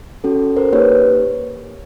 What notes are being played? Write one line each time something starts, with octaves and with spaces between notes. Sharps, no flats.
C#4 F#4 A4
A#4 C5
A#3 D#4 G4 B4 C#5